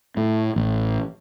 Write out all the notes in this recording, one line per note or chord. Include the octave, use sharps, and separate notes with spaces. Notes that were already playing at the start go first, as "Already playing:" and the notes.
A2
A1